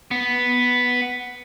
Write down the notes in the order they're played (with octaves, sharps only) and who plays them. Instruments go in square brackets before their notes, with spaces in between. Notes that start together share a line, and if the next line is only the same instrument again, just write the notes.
[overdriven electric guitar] B3